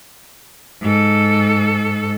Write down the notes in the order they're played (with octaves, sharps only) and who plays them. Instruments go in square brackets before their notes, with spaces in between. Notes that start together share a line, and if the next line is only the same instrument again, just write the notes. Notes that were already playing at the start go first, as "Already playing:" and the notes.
[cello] G#2 A4